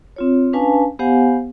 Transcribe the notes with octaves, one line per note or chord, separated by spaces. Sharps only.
C4 F4 C#5
C#4 D4 B4 F5 G#5 A5
B3 G4 C5 F5 F#5 G#5